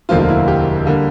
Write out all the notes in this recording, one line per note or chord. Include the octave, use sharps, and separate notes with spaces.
E1 D2 D3 F3 A#3 F4
F4
E4
G4
D3 G3 A#3